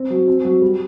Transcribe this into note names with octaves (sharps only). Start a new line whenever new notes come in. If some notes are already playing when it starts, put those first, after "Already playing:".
Already playing: C4
F#3
C4
F#3
G3